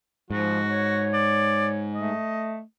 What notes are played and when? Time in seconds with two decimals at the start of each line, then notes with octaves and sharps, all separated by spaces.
0.31 G#2 F3 F#4
0.66 C#5
1.14 D5
1.94 A3 D#5